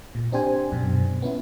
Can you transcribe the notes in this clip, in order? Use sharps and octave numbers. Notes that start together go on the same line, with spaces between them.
A#2
C4 D4 G4 C5 G#5
F#2 B2
B2
B3 C#4 E4